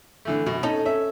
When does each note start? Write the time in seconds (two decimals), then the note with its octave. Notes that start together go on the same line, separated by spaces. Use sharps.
0.25 D3 E3 A3
0.46 F#2 B2
0.63 C#4 D#4 A4
0.85 C#4 E5